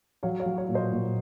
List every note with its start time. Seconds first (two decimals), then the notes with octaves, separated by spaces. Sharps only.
0.23 F#3 C#5 F5
0.40 C#5 F5
0.46 F#3
0.57 C#5 F5
0.69 A#2
0.75 C5 D#5
0.92 A#2